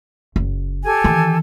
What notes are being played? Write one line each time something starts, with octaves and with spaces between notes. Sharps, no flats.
F#1
G4 A4 G#5
D#3 E3